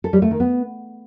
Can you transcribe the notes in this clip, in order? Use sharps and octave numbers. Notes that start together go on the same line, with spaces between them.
A4
G3
A3
D#3
B3